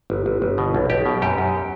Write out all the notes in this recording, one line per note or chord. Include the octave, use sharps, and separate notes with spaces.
G1
G1
G1
B2
B1
B1 G4
B2
F#2 G4
F#2